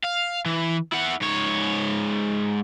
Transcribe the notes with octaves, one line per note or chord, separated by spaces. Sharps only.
F5
E3
E4 F#5
G#2 C#5